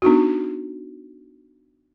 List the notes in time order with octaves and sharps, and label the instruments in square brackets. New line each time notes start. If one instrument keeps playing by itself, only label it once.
[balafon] B3 D4 D#4 F#4